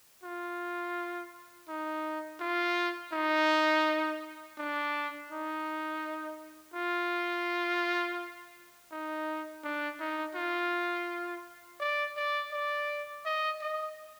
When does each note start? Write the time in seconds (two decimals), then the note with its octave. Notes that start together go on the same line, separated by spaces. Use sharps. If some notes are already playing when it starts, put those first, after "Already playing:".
0.23 F4
1.69 D#4
2.40 F4
3.13 D#4
4.58 D4
5.30 D#4
6.74 F4
8.92 D#4
9.64 D4
10.00 D#4
10.35 F4
11.80 D5
12.17 D5
12.52 D5
13.25 D#5
13.62 D#5